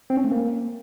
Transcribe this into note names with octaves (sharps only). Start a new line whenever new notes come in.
C4
C#4
A3
A#3